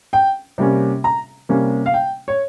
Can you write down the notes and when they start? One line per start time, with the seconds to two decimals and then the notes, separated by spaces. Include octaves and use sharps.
0.13 G5
0.58 C3 G3 A#3 C#4
1.04 A#5
1.49 C3 G3 A#3 C#4
1.86 F5
1.94 G5
2.28 C#5